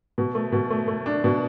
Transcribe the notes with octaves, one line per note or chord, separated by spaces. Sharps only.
B2
A3
B2
A3
A3
D4
B2